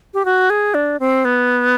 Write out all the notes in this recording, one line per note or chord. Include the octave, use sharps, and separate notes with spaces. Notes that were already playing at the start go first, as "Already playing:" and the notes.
G4
F#4
G#4
D4
C4
B3